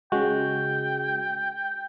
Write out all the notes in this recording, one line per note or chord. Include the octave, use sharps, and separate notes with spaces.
C#3 G#3 F#4 G5